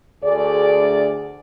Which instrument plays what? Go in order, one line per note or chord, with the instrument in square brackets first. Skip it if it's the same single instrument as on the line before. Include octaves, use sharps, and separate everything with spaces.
[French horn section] D2 G#4 D5